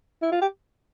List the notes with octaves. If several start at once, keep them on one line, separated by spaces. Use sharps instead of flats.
E4
F4
G4